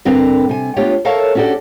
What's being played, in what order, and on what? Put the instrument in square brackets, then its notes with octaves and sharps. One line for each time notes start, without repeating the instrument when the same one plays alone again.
[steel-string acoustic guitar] G2 D3 C4 A#4 B4 F5
C3 G#5
A3 B3 D4 F4 G4 C#5
A4 A#4 C#5 E5 F5 A5
C#4 D4 F#4 G4 A4 D5